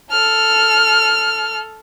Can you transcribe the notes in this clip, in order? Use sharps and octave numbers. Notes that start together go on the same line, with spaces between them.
A4 F6